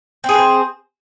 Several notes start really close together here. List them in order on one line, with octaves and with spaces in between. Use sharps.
C4 G#4 B4 C5